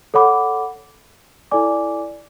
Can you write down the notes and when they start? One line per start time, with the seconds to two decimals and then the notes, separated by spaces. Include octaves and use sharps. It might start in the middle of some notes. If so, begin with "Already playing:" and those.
0.14 A4 C#5 F#5 B5 D6
1.51 E4 A4 D5 G#5 D6